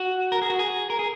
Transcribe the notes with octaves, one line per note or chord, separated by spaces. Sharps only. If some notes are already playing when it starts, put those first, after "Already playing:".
Already playing: F#4
A#4
G#4
F#4
G#4
A#4
G#4